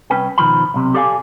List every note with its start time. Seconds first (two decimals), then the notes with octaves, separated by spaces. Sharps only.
0.10 C2 C#4 B4 G5
0.38 B2 D#3 F3 B5
0.74 B1 C3
0.94 G4 A4 D5 F5 F#5 G#5